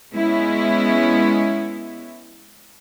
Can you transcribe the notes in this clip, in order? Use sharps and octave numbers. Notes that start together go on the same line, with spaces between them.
G#3 B3 C#4 E4